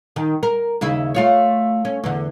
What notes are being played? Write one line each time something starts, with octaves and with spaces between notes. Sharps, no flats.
D#3
A#4
D#2 C#3 E4
A3 F4 C#5
C#4
E2 D3